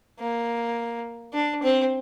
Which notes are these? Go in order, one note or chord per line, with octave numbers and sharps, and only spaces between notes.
A#3
D4
C4